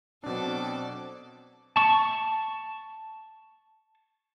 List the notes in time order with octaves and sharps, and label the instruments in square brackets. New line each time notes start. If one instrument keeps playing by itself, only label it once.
[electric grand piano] B2 D4 [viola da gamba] F#3 A4 D5 [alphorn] C4
[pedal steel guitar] A5 C#6